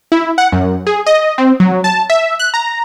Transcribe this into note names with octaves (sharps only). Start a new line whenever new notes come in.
E4
F#5
F#2
G#4
D#5
C4
F#3
A5
E5
F#6
A#5